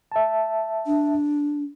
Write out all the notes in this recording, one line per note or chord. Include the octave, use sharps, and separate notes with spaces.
E5 A5
D4